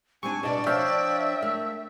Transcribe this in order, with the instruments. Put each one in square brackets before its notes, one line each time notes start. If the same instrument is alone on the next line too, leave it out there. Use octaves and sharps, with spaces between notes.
[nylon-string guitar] G3 D4 [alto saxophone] C4 [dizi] G#5 [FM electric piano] C#6
[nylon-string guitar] B2 D#5 A5 [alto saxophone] D4 [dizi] D5
[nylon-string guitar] F3 D4 [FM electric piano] C#5 F5 G5 [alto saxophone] E5
[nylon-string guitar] A3 [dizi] A#4